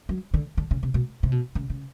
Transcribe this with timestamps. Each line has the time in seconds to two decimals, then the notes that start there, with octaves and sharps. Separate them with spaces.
0.09 F#3
0.34 D3
0.57 D3
0.71 C#3
0.83 C3
0.94 B2
1.23 C3
1.32 B2
1.55 C#3
1.70 C#3